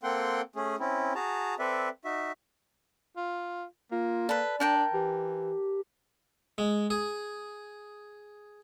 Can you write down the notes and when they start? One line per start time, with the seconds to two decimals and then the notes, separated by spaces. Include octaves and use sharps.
0.03 A#3 C4 A4 F#5 G5 C6
0.56 A3 C#4 G#4
0.80 C4 C#4 E4
1.15 F#4 G#4 A5 A#5
1.59 C4 A4 B4 D5 E5
2.05 D#4 F#4 E5
3.17 F4
3.92 A#3 F4
4.29 A4 B4 D5
4.60 D4 A#4 G5 A5
4.93 E3 G4
6.58 G#3
6.90 G#4